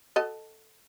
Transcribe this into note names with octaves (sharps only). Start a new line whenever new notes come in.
F#4 A4 D#5